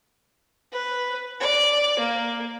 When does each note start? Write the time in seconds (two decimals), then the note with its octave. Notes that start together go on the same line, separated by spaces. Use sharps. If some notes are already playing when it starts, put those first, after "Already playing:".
0.72 B4
1.40 D5
1.99 A#3